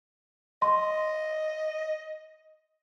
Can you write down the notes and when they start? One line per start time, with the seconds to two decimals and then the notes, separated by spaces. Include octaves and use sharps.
0.62 D#5 C6